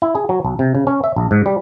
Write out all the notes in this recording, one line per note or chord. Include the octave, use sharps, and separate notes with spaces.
E4
G#4
F#3
B1
C3
C#3
C#4
E5
A#1
G#2
G3